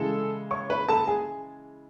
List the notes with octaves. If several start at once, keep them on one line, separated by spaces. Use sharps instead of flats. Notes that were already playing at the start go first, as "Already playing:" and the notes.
Already playing: C#3 E3 G#3 A4
C#5 C#6
B4 B5
A4 A5
G#4 G#5